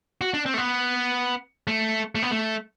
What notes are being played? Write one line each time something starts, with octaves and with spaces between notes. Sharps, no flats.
F#4
D4
C4
A3
B3
A3
A3
B3
A3